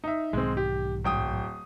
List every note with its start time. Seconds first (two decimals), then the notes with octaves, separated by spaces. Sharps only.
0.04 D#4 E5
0.33 B1 G#2 D#3 G#3 C4
0.57 G4
1.04 D1 G5 D#6